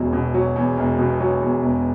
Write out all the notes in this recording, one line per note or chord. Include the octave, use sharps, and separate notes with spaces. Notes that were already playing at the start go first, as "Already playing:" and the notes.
Already playing: E1 E2 B2 F#3
B2
F#3
E2
E1
B2
F#3
E2
E1